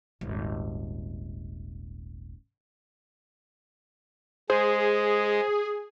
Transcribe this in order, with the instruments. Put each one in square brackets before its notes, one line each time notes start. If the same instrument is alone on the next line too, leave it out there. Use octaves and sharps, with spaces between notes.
[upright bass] D#1 G#1
[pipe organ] G#3 [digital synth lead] G#4 [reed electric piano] C5